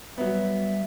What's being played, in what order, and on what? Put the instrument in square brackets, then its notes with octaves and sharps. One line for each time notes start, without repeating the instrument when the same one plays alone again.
[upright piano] F#3 B3 [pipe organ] G3 E5